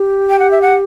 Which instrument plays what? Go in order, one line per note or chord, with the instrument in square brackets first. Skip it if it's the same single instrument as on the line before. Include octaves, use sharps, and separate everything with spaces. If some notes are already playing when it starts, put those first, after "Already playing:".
Already playing: [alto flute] G4
[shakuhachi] G5
F#5
E5
F#5